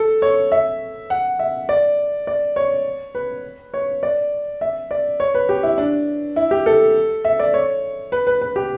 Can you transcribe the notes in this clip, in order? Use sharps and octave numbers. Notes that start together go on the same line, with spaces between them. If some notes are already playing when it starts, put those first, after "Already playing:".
Already playing: A4
C#5
E5
F#5
E5
D5
D5
C#5
B4
C#5
D5
E5
D5
C#5
B4
G4
E4
D4
E4
G4
A4
E5
D5
C#5
B4
B4
B4
G4